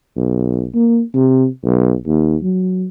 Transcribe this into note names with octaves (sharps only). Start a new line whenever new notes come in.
B1
A#3
C3
B1
D#2
F#3